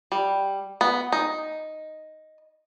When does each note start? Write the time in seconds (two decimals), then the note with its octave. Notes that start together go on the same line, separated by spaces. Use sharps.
0.12 G3
0.81 B3
1.12 D#4